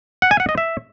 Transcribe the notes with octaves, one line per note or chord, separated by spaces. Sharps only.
F#5
G#5
F#5
D#5
E5